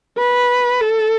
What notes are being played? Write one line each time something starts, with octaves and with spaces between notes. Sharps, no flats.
B4
A4